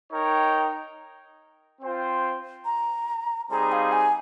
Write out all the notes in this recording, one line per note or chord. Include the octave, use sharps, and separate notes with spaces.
D#4 A#4 C#5 G5
C4 F4 C5 G5
A#5
G3 C4 D#4 G#4 C5 A#5
F5
G#5